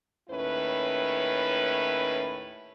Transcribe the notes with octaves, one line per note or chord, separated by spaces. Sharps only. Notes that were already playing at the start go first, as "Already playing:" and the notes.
D#2 A2 C#4 E4 B4